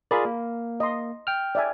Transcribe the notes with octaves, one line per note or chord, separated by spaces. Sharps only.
F4 G#4 A#4 D5 B5
A#3
D#5 C6
G5 F6
D5 E5 G#5